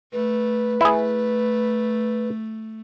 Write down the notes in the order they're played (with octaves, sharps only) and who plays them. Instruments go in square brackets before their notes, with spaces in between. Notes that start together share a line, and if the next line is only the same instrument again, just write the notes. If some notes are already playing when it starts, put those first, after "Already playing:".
[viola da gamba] A3 [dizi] B4
[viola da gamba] A3 [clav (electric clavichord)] E4 G#4